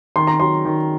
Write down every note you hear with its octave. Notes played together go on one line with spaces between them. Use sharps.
D#3 C6
A#5
F#3 C6
D#3